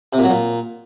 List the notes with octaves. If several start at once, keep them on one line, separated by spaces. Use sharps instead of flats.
C3
A#2
F#3
A#2